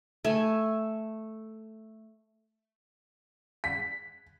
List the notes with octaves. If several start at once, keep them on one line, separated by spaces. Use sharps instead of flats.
A3 G#5
B6